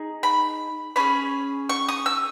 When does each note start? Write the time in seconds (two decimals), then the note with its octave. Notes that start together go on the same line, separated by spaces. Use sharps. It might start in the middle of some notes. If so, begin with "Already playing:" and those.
Already playing: D#4 G#4
0.23 B5
0.96 C#4 G#4 B5
1.69 C#6
1.88 D#6
2.06 E6